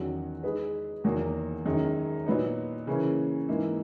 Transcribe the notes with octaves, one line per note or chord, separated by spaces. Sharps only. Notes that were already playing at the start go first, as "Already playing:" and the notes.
Already playing: E2 D#3 F#3 C#4 F#4
G#3 D#4 G#4 B4
E2 D#3 F#3 A#3
F#2 D#3 G#3
A#2 F#3 B3 D#4
C#3 E3 A#3 C#4
G#2 E3 A#3 D#4